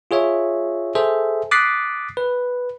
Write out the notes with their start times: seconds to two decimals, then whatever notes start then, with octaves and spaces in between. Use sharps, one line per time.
0.11 F4 G#4 C#5 E5
0.95 G#4 A4 C5 E5
1.51 D6 D#6 F#6 A6 B6 C7
2.17 B4